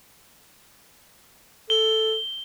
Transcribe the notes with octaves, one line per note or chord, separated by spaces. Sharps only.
A4 G7